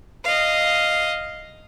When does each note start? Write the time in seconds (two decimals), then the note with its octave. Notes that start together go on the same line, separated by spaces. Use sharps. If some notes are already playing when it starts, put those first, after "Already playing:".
0.24 D#5 F5